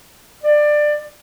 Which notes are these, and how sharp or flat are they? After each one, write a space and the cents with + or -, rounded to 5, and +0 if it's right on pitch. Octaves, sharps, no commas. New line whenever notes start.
D5 +20